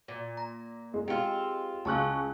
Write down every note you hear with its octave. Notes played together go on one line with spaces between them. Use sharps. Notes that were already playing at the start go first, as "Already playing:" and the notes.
A#2
A#5
G#3
C4 F4 G4
C#2 F5 G#5 A5 C#6 F#6